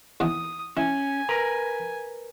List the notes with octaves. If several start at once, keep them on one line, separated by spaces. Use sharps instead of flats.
D#2 E3 B3 D#6
C#4 E4 G#5
A#4 B4 A#5